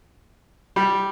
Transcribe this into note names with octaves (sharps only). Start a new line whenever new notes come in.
G3